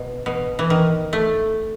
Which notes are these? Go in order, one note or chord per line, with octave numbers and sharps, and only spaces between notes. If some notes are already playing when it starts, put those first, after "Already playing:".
Already playing: B2
B2
E3
D#3
A3